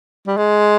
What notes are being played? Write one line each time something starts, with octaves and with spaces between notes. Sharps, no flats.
G3
G#3